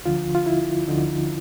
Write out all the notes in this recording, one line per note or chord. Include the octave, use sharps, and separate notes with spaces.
D2 D3 F3 F4
F4
E4
D2 D3 F3 D#4